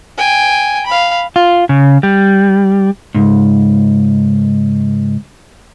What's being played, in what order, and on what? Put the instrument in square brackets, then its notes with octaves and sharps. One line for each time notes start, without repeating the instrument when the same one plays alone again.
[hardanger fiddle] G5 G#5
F5 B5
[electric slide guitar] F4
C#3
G3
[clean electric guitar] C#2 G#2